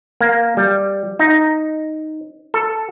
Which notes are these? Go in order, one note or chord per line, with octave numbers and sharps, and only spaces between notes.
A#3
G3
D#4
A4